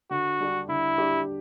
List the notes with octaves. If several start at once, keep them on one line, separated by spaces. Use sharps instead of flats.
D3 F#4
G3 D4 G4
D3 E4
G3 D4 G4